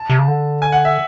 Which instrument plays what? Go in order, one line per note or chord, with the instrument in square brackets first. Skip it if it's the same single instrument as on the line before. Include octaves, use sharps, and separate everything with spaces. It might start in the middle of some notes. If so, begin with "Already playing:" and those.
Already playing: [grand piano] A5
[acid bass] C3
C#3
D3
[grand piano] G#5
F#5
E5